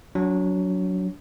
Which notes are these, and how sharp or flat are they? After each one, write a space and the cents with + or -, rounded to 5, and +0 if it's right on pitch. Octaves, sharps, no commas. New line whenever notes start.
F#3 +0 D4 -35